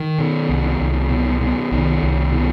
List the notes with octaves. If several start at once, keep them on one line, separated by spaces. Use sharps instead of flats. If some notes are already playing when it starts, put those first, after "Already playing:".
Already playing: D#3
B2
C2
C2
B2
B2
C2 D#3
C2
B2